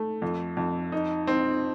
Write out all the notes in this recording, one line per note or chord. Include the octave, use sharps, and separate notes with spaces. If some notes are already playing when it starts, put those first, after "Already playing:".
Already playing: A3
F2
F2
D#4
C4